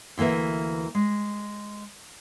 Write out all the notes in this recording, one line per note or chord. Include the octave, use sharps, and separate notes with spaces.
D2 E3 A#3 B4 E5
G#3